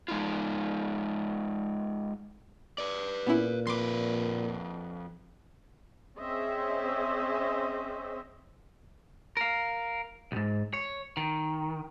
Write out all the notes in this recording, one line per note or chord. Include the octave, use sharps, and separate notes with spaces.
G#3 D#4 F4
B4 D5
A#2 B3 C#4 E4
F2 B4 C6 D6
C4 C#4 G#4 C5 D#5 E5
A#4 F5
B1 G#2
C#5
D#3